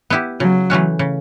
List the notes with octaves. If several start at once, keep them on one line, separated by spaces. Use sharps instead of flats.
B3 E4 G4
C#3 F#3
E3 A3 C#4 F#4
C#3